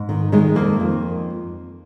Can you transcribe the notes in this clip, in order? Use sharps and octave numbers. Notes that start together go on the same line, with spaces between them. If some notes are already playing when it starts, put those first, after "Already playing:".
Already playing: G#2
D#3
D#3 G#3
F2 A#3
F2